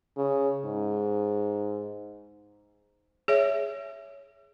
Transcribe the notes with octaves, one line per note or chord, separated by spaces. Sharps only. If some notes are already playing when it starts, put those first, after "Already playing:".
C#3
G#2
G#4 C#5 E5